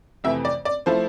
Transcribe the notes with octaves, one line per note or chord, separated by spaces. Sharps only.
F2 C3 E3 A3 E5
D5
D5
F3 A3 E4 C5